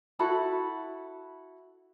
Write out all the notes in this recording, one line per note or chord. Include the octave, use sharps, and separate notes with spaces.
E4 F#4 A4 B5